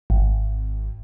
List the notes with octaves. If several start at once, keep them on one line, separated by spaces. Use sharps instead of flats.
G#1